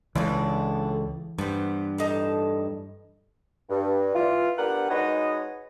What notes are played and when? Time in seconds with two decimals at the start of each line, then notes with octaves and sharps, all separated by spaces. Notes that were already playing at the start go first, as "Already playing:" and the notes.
0.15 C#2 A2 E3 D4 D5
1.39 G2 B3 C5
1.98 A2 D#4 A5
3.70 G2
4.14 E3 F4
4.58 B3 D4 G4 A#4 B4 F#5
4.89 G#3 D#4 F#4 B4 C#5 D#5